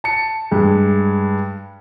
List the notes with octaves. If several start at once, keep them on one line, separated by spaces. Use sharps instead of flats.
A5 C#7
G2 G#3